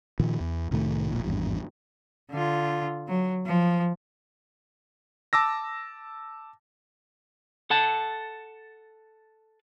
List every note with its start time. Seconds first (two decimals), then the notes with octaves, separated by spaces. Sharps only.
0.20 A#2 D#3 F3
0.40 E2
0.71 C2 A2 D#3 A3
1.11 E1 A#1 A#2
1.25 G#1 E2 G2
2.31 D3 F4
3.09 F#3
3.46 F3
5.33 A5 D6 E6 A#6
7.70 A4 F#5 A5